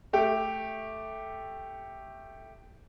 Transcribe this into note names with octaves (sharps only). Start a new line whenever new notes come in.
A3 G4